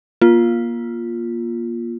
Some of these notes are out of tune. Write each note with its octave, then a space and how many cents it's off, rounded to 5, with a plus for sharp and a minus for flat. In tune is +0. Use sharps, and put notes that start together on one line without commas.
A#3 +30 F4 +0